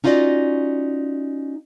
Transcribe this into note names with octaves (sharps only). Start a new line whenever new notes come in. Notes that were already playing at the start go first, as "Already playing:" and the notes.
C#4 D#4 F4 F#4 D5 D#5